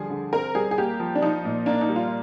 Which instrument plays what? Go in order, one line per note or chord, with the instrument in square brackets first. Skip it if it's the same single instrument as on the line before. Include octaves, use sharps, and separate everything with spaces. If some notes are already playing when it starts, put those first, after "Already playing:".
Already playing: [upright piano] D3 F3 G3 [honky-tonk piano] G#4
[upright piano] D3
[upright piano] C4 [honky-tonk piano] A#4
[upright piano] G3 [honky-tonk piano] G#4
[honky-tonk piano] G#4
[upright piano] A#3 [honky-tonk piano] G4
[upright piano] F3
[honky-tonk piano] D4
[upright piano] F3 [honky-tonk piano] D#4
[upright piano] A#2
[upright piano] A#3 [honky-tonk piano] D4
[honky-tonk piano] D#4
[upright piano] G3
[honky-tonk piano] F4